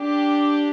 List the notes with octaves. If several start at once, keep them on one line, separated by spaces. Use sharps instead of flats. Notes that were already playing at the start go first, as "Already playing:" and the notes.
Already playing: D4 G4